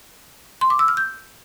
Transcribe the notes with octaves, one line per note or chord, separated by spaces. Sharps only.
C6
D6
E6
F6
G6